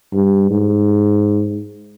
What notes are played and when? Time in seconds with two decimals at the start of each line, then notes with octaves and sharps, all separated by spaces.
0.13 G2
0.51 G#2